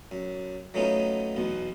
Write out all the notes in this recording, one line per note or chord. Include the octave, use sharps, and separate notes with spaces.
F#2
F#3 A3 B3 C#4 D#4 F4
B1 E2 B2